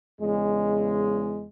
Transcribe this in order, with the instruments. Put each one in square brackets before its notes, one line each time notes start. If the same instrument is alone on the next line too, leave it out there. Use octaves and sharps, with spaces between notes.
[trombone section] E2 C#3 G#3